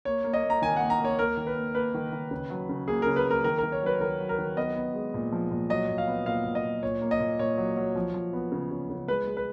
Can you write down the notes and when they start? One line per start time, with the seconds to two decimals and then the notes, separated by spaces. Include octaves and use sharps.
0.05 A#3 C#5
0.24 A#3
0.34 D#5
0.43 A#3
0.50 A#5
0.62 D#3 G#5
0.76 A#3 F#5
0.90 A#5
1.00 A#3 C#5
1.19 A#3 A#4
1.37 D#3
1.47 B4
1.56 A#3
1.75 A#3 B4
1.94 D#3
2.12 D#3
2.31 C#3
2.50 F#3
2.69 C#3
2.88 A#3 G#4
3.02 C#3 A#4
3.16 B4
3.25 A#3
3.31 A#4
3.44 D#3 A#4
3.58 D#3 A#4
3.72 C#5
3.82 F#3 B4
4.00 D#3 A#4
4.20 F#3
4.29 A#4
4.38 D#3
4.57 B3 D#5
4.76 B3
4.94 G#3
5.14 A#2
5.32 F3
5.51 A#2
5.70 F#3 D#5
5.89 A#2
5.98 F5
6.08 B3
6.26 A#2 F5
6.45 A#2
6.55 D#5
6.64 A#2
6.83 A#2 C#5
7.01 A#3
7.11 D#5
7.20 A#2
7.39 A#2 C#5
7.58 F#3
7.77 F#3
7.96 F3
8.14 F3
8.33 B3
8.52 C#3
8.71 C#3
8.90 C#3
9.08 G#3 B4
9.28 G#3
9.37 B4